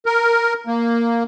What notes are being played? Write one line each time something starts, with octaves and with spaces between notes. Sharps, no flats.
A#4
A#3